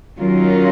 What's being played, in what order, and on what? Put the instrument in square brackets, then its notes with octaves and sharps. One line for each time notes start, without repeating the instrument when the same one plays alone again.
[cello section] D#3 F#3 C#4 F4 A#4